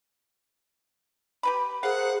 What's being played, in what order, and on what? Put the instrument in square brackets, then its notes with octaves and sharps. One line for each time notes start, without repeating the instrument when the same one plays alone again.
[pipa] G4 B4 B5
[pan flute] G#4 [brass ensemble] A#4 C5 F#5 [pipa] F5